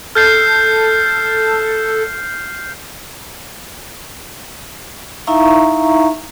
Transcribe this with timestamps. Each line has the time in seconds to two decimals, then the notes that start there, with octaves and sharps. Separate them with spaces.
0.15 A4 F6 G6 C7
5.27 D#4 E4 E5 F5 A#5 C#6